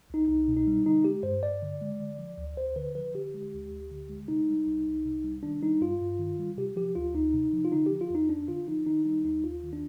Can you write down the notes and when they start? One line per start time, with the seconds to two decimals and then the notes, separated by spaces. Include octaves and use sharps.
0.10 C2 D#4
0.28 C2 D#4
0.48 B2
0.57 D#4
0.67 G3
0.86 D3 D#4
1.04 G#3 G4
1.23 G2 C5
1.43 G2 D5
1.62 D3
1.81 G#3
2.00 D3
2.19 F3
2.38 D2
2.57 D2 C5
2.76 D3 B4
2.95 F3 B4
3.14 D3 G4
3.34 G#3
3.53 D2
3.72 D2
3.91 D3
4.09 G#3
4.28 C3 D#4
4.48 G3
4.67 C2
4.86 C2
5.05 C3
5.24 G3
5.43 D#3 D4
5.62 G3 D#4
5.81 G2 F4
6.01 G2
6.19 D#3
6.39 G3
6.58 C3 G4
6.76 F3 G4
6.95 D2 F4
7.15 D2 D#4
7.34 C3
7.53 F3
7.65 F4
7.72 D3 D#4
7.86 F3 G4
8.01 F4
8.10 F2 D#4
8.29 F2 D4
8.48 D3 F4
8.67 F3 D#4
8.86 D#3 D#4
9.05 G3 D#4
9.24 D#2 D#4
9.44 D#2 F4
9.63 D#3
9.73 D4